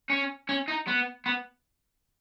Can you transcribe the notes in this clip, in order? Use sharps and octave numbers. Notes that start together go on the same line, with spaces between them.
C#4
C#4
D#4
B3
B3